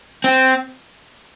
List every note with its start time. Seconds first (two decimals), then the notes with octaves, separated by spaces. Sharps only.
0.24 C4